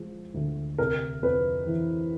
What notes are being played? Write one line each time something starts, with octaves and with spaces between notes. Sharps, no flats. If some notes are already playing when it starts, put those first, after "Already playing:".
Already playing: F3 G#3
D2
C3 A#4
F2 B4
E3